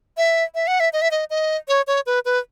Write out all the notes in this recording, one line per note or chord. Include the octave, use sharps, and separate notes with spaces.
E5
E5
F#5
E5
D#5
E5
D#5
D#5
C#5
C#5
B4
B4